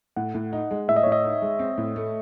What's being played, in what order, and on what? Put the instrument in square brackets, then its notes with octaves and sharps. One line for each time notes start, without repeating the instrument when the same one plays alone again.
[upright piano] A2 [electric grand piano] F#5
[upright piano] A2
D#4
G#3
[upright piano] A2 [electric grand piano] E5
[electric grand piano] D#5
[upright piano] A2 [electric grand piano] C#5
[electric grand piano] D#5
[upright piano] D#4
G#3
C4
A2
A3